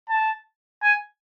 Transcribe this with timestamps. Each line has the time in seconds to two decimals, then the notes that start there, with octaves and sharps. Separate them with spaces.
0.09 A5
0.82 G#5